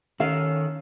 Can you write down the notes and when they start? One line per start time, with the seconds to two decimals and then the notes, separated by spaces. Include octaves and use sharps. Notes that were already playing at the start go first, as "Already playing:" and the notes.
0.20 D#3 C#4 A4 F5